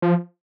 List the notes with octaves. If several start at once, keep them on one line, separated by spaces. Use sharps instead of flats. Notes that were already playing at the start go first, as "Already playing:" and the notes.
F3